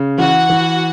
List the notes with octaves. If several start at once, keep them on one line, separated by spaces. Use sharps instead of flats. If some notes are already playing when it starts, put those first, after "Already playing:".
Already playing: C#3
E3 F#4 F#5
E3